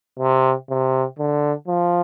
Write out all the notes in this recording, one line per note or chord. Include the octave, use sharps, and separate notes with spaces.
C3
C3
D3
F3